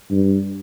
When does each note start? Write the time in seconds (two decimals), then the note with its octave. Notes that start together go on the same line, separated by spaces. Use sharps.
0.11 G2